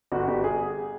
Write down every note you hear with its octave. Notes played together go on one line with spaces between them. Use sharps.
G1 F#4
G1 G4
G#4